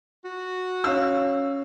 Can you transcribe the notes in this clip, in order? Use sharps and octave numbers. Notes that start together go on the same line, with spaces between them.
F#4
C#4 F5 E6